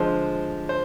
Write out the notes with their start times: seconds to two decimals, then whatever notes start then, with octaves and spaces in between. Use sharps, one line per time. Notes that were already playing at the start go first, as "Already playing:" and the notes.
Already playing: D3 F3 G#3 C5
0.69 C5